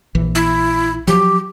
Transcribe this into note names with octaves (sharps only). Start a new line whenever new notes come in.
A#1 E3
E4
F3 F#3 G4